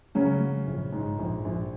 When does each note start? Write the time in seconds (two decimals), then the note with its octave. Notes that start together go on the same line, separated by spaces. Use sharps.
0.15 C#3 F#3 C#4
0.40 F#3
0.67 A#1
0.92 G#2
1.19 A#1
1.45 A#1